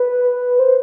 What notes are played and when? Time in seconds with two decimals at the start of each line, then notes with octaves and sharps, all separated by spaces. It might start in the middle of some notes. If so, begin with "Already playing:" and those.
Already playing: B4
0.59 C5